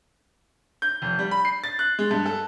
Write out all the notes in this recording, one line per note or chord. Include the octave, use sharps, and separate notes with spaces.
G6
F1
G3
B5
C7
A6
F#6
G#3
G2
A4